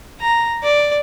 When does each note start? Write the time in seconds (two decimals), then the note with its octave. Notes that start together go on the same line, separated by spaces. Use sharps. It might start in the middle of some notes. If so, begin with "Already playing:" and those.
0.20 A#5
0.63 D5